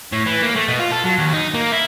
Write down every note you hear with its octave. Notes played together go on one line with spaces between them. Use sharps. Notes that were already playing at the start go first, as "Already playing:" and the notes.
A2
E3
A#3
A3
B2
F4
A4
F#3
D#2
D#4
A#3
E4